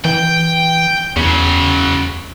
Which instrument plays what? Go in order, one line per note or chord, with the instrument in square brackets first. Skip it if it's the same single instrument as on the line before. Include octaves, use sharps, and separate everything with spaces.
[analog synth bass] E3 [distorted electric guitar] G5
[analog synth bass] E2 [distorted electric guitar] C#3 F#3